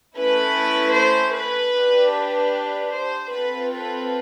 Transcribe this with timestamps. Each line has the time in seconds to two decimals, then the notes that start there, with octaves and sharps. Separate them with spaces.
0.17 A3 C#4 E4 B4
0.96 C5
1.35 B4
1.75 D4 G4
2.15 B4
2.93 C5
3.32 C4 F4 A4 B4
3.72 B4